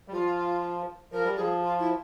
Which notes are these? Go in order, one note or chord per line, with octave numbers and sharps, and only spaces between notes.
G3
F3 F4
F3 A#4
G3
F3 G#4
F4
E4